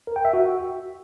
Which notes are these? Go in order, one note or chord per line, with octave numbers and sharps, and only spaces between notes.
A#4
G5
E5
F#4